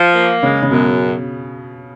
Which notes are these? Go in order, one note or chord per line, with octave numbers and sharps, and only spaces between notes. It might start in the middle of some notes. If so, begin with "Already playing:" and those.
Already playing: F3
A#3
C#3 G#3
C#3
F#2 B2